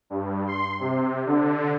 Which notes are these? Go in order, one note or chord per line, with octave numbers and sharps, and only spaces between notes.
G2
C6
C3
D3